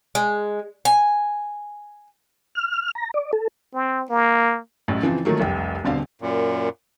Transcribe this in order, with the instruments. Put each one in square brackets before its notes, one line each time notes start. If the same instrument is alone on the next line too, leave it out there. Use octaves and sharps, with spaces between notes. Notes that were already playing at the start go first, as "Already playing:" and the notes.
[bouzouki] G#3
G#5
[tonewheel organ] F6
A#5
D5
A4
[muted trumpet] C4
A#3
[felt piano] A1 F#2 A2
C#3 E3 F3 C4
D#3 F3 F#3 A3 A#3
F1 C2 G5
D#1 B2 D3 C4 F5
[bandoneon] F#2 A#2